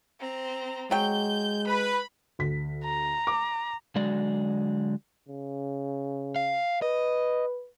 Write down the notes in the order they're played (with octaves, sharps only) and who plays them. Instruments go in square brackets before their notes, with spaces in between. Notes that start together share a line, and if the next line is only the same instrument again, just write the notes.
[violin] C4 A#5
[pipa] F#3 G5 [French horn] G#3 [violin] G6
[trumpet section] B4 [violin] B5
[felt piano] D2 B6
[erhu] A#5
[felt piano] D6
[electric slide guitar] D3 F#3 G#3 F#4 D5
[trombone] C#3
[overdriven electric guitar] F5
[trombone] B4 [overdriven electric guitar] D#5